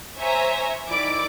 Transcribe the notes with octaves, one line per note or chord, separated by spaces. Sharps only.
C5 C#5 E5 G#5 A#5
D#3 E4 D5 D6